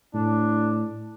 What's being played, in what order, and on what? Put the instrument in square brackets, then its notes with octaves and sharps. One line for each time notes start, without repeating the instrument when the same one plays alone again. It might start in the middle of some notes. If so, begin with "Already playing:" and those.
[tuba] A2 [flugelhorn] D4